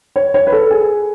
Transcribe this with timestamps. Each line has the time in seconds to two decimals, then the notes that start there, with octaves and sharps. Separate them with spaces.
0.16 C#5
0.34 C#5
0.47 B4
0.52 A4
0.71 G#4